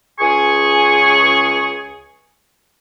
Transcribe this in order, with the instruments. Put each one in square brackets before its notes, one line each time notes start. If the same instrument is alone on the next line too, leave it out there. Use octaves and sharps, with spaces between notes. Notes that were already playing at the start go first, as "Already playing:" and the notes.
[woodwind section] C#2 G#4 G#5 C#6